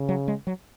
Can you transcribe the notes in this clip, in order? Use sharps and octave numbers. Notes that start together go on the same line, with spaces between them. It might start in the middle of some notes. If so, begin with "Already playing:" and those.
Already playing: C#3
F#3
G#3
F#3